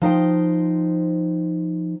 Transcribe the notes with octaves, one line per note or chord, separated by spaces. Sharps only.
F3 D#4 C5 G5